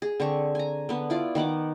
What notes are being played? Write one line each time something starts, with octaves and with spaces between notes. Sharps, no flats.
G#4
D3 C4 C#6
G#5 A#5
D3 B3
E4 F4 D5
D#3 B3 F#5 D6